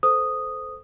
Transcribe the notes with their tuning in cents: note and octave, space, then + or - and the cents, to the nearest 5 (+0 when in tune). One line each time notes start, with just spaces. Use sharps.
A4 -15 C5 -20 D#6 -5